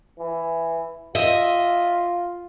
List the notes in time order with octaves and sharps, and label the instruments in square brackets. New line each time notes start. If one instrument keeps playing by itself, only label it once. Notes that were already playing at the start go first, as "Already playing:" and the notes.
[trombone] E3
[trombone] F4 [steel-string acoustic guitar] D#5 E5